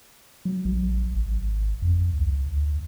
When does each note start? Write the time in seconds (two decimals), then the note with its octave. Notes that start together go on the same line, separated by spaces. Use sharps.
0.45 F#3
0.65 A#1
1.14 G#1
1.82 F2
2.13 C#2
2.46 D2